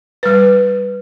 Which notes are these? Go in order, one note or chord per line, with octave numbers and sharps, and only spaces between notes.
G3 B4